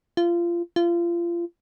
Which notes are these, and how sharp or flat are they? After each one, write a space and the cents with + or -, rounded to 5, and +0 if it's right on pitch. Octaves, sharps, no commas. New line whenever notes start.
F4 -25
F4 -30